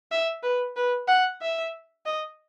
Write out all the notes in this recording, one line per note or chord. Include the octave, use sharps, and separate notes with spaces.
E5
B4
B4
F#5
E5
D#5